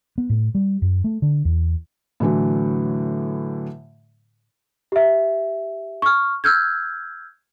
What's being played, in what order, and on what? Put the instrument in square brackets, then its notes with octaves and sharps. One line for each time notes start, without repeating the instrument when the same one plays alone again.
[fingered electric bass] B3
A2
G3
F#2
A3
D3
E2
[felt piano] A2 D3 E3 F#3
[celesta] G4 E5
C#6 F6
E6 F6 G6 G#6